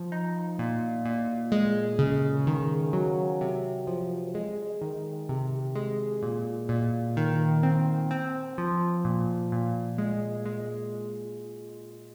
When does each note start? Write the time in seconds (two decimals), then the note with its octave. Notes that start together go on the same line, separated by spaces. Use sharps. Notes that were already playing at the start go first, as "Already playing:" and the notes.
Already playing: F3
0.12 D#4
0.59 A#2
1.05 A#2
1.52 G#3
1.99 C#3
2.47 D#3
2.93 F#3
3.41 C3
3.87 F3
4.35 G#3
4.81 D#3
5.29 C3
5.75 G#3
6.22 A#2
6.69 A#2
7.17 D#3
7.63 C4
8.11 C4
8.58 F3
9.05 A#2
9.52 A#2
9.98 G#3
10.46 G#3